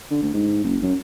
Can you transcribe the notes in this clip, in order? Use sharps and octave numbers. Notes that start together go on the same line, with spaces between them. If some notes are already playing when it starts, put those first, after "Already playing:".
D3
D2
G#2
F#1
F#2